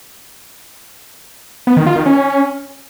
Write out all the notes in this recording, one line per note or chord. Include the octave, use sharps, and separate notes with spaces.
B3
D#3
F4
D#3
C#4